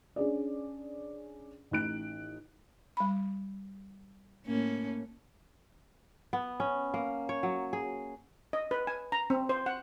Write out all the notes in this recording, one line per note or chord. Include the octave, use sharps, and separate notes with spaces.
C#4 D4 G#4 D5
A1 D#4 F#6 D7
G3 B5
A2 A#3 C#4
B3
C#4
A#3
C#5
F#3
G#4
D#5
B4
G#5
A#5
C4
C5
F#5